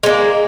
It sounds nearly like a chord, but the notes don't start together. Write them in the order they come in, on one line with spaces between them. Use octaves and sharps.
G#3 C#4 A#3